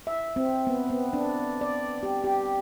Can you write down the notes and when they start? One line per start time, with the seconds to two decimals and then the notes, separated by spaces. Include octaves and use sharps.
0.07 E5
0.36 C4
0.67 B3
0.90 B3
1.13 D4
1.61 D5
2.03 G4
2.24 G4